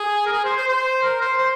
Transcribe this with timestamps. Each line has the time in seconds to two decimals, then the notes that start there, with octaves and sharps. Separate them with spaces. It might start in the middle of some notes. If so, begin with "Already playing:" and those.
Already playing: G#4
0.26 A#4
0.32 G#4
0.44 C5
0.57 C5
0.68 C5
1.03 A#4
1.21 C5
1.37 C5